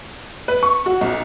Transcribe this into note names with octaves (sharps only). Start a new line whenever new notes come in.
B4
C#6
F#4
B1